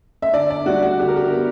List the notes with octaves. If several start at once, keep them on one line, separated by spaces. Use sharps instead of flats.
E5
D3 D5
D5
G3 F#4
F#4
D3 G4
A#4
G4
B3